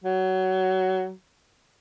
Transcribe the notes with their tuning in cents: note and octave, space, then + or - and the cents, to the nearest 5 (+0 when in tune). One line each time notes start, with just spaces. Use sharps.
F#3 +20